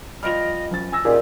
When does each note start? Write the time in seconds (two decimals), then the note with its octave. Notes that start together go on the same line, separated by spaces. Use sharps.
0.23 F3 G3 D#5 F6 D7 F7
0.71 F#1 C#4 A6
0.92 G#5 E6 A#6
1.05 A#2 C#4 D#4 G4 G#4